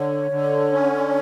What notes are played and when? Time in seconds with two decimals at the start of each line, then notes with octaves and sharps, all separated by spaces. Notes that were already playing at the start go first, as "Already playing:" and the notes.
Already playing: D3 C#5
0.31 D3
0.73 C#4